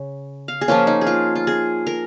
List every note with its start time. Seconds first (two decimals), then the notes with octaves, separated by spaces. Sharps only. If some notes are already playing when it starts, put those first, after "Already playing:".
Already playing: C#3
0.48 F5
0.61 G#4
0.68 F3 A#3 C#4 F4
0.87 D#4
1.01 G#4
1.07 F4
1.35 F4
1.47 G#4
1.87 A#4